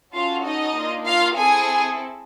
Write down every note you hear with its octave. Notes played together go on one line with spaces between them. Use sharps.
C#4 F4 F#4 A4 F5
D#4 D#5
A#3 D4 F4
F4 F5
C4 E4 G#4 A4 G#5